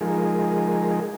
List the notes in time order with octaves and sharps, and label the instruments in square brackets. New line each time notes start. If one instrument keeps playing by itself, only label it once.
[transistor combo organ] F3 G#3 D#4 G#4 A#4